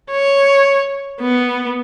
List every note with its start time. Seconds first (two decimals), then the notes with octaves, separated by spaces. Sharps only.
0.11 C#5
1.21 B3